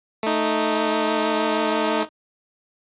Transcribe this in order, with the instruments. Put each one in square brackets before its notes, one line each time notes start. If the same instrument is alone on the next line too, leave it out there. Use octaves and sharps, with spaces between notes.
[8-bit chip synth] A3 D#4